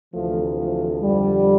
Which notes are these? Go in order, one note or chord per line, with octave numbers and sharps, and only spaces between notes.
D2 C3 E3 F3 A3
F3 A3
F2 D3 F3 G3